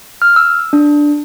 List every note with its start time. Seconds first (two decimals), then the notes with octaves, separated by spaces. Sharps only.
0.22 F6
0.36 E6
0.73 D4